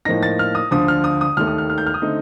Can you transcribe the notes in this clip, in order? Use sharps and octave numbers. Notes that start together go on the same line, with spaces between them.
A2 F3 A#3 D#4 A#6
A6
F6
D#6
D2 D3 F3 D#6
F6
D#6
D#6
D#2 D#3 A3 F6
D#6
F6
F6
G6
F6
D#6
D3 A3 C4 D#4